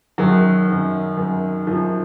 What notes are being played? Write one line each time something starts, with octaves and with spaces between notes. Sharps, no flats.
F#2 D#3 F#3
F#2 D#3
F#2 D#3
F#2 D#3 F3